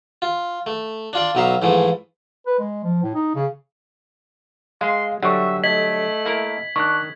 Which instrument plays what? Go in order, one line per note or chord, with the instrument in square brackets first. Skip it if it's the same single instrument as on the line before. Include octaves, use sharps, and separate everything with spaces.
[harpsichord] F4
A3
D4 F4 D5
B1 F#3 D#4 E5 F5
G#2 E3 F3 A3
[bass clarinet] B4
G#3
F3
A2
D#4
C#3
[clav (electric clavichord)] G#3 [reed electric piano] F5 [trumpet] C6
[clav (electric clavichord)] D3 F#3 G3 [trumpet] E5 [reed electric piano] F#5 C#6
[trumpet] A3 [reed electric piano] D#5 [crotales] G#6 B6 F#7
[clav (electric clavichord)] A#3 E4 A#4
[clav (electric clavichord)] D#3 [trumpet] D4 [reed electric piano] C#6 F#6